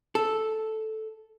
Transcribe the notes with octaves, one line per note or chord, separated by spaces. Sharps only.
A4